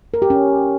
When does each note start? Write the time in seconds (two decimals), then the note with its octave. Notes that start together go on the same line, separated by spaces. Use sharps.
0.14 A#4
0.22 G4
0.30 C#4